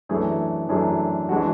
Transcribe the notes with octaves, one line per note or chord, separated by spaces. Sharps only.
F#2 E3 A3 D4 G#4
F#2 E3 A3 D4 G#4
E3 G#3 D4 F#4